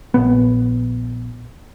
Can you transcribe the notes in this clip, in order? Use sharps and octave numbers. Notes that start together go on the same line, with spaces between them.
A#1 B3